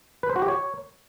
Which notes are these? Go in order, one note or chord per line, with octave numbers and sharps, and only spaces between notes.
B4
C5
F#4
G4
C#5